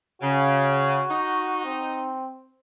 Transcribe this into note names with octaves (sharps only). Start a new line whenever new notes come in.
C#3 F#4
D#4
C4